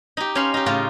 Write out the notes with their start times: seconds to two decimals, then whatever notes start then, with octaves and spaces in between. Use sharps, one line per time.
0.17 D#4 G4
0.35 C#4 C#5 F5 B5 C6
0.54 D#4 G4
0.66 A2 C#3 F4